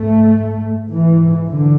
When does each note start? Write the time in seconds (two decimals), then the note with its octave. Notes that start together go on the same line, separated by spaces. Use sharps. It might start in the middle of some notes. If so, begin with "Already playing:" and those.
Already playing: G#2 A3
0.91 G#2 E3
1.48 D3